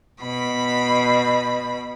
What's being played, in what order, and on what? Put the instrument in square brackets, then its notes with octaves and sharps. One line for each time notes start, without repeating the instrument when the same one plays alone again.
[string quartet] B2 B5